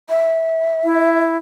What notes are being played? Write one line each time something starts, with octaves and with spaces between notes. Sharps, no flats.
E5
E4